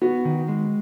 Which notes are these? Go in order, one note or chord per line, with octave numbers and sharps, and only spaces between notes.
B3 F#4
D#3
G#3